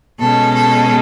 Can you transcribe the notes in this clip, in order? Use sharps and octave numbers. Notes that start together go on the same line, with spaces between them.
B2 G#3 C#4 A4
A4